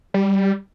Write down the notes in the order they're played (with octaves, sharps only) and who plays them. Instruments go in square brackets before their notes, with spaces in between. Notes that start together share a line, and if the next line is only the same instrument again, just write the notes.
[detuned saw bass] G3